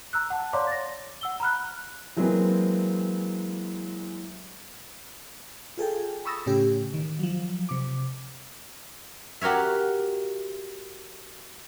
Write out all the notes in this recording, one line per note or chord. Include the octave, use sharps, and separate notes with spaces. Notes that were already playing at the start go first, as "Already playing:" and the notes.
A#5 E6 F#6
F#5 A5
C#5 D5 F5 A#5 C6 D6
A6 A#6
F#5 E6 G7
A#5 B5 F6 F#6
E3 F#3 G#3 A#3 C4 B4
F4 G#4 A4 G5
B5 C#6 D#6 E6 A6 A#6
A2 C#3 C#4 G4
D#3
F3 F#3
C3 D6
F#4 G4 A#4 C#5 E5